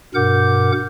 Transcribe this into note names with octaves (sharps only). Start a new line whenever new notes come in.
G2 B2 A#4 F#5 D6 G6